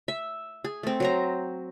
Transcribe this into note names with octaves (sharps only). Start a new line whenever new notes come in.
E5
G#4
A3 C4
F#3 C5 A#5